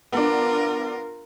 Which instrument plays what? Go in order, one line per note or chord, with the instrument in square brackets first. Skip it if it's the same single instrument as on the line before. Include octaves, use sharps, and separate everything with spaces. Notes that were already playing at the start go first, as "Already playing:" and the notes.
[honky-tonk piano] B3 D4 [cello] F4 A#4